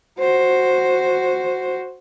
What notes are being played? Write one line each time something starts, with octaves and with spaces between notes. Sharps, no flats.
F#4 C5